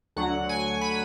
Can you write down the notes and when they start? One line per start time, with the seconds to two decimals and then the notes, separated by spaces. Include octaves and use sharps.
0.16 D2 D3 F#3 F#5
0.49 G#5
0.81 B5